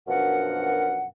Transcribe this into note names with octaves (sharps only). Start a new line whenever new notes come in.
F#2 B2 F3 D4 A#4 F#5